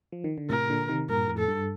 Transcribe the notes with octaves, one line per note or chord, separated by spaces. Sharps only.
F3
D#3
D3
A2 C3 A#4
A#2 D3
C3 D#3
G2 A#2 A#4
F2 A2
A4
G2